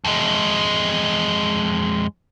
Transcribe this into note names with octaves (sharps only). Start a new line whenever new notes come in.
F2 G#3